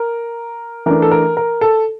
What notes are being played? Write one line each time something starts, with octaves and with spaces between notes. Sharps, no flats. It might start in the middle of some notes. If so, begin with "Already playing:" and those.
Already playing: A#4
E3 A3 D4 A#4
A4
A#4
A#4
A4